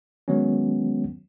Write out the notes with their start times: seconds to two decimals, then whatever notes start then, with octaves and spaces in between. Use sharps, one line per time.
0.28 D#3 F#3 G#3 B3 C#4